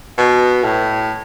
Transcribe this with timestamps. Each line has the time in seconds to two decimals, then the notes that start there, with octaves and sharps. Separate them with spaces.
0.18 B2
0.64 A2